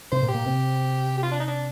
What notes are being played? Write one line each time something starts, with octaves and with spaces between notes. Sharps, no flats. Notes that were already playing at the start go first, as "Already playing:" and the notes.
C3 C4 C5
A#2 A#3
G4
A#2 A#3
C3 C4
G4
F4
D4
D#4
D4